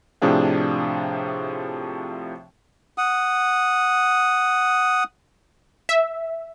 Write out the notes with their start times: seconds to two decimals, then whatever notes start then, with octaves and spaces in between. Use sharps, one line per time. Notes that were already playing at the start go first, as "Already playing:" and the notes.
0.22 A2 C3 F3 D4 G#4 F5
2.98 F#5 D#6
5.89 E5